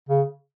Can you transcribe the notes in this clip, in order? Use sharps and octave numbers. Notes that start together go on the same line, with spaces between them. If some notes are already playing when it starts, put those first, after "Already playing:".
C#3